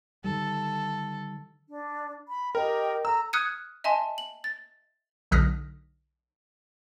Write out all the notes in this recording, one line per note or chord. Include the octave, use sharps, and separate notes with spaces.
D3 D#3 G3 A4
D4
B5
G4 A#4 D#5 G5
A4 A#5 E6
D#6 F6 F#6 G#6 C#7 D#7
D#5 E5 G#5 A5 C6
F#7
A6
B1 D3 D#6 F6 A#6 B6